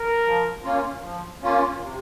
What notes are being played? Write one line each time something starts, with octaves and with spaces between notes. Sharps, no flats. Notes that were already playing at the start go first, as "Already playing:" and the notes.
Already playing: A#4
F3
A#3 C#4 F4
F3
A#3 C#4 F4
C3